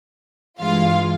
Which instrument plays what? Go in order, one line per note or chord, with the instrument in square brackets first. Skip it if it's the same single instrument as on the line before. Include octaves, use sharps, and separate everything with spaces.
[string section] G2 E3 G#3 F4 F5